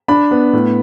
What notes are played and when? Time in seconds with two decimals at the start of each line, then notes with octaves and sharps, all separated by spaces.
0.08 D4 B5
0.31 B3
0.53 A2